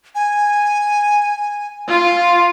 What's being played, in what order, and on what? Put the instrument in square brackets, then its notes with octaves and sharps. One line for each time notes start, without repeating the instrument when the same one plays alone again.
[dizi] G#5
[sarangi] F4